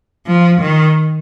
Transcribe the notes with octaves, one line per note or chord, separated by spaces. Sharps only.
F3
D#3